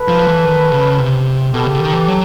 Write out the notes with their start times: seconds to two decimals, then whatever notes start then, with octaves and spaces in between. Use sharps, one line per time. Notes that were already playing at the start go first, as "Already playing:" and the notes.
Already playing: A4 B4
0.08 F3
0.27 E3
0.45 D#3
0.71 C#3
0.98 C3
1.53 B2 G4 A4
1.66 C#3
1.80 D#3
1.93 E3
2.07 F#3